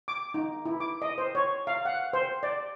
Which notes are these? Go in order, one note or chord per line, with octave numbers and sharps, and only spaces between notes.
D6
D#4
E4
D6
D#5
C5
C#5
F5
F#5
C5
D5